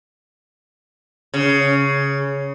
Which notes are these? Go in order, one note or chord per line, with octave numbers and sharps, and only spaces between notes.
C#3